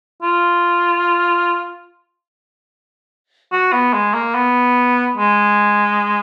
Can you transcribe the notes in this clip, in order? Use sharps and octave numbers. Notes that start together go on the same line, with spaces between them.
F4
F#4
B3
G#3
A#3
B3
G#3